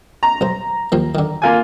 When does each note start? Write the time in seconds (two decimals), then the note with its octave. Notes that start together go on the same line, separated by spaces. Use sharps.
0.23 A#5
0.41 B1 C5
0.92 D#2 F3 A#3
1.15 D3 D#3
1.42 A#3 F4 G#5